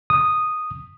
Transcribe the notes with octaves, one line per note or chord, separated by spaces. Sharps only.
D#6